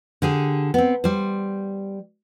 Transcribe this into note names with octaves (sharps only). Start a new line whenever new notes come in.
D3 G4 G#4
B3 C4
G3 C5